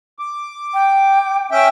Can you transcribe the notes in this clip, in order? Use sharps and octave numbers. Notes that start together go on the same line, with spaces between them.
D6
G5
C#4 E5 G5